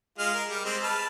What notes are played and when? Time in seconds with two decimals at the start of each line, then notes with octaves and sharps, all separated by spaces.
0.19 G#3 F4 F6
0.34 A#4
0.50 G3
0.65 G#3 C4
0.83 B4 A5 F6